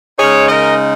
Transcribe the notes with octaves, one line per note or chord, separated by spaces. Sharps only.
C#3 G#3 D#4 G#4 C#5
A#4 D#5